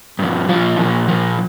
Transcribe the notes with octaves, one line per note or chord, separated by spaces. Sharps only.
G2 F3
A#2 F3 F4
A#2 F3
A#2 F3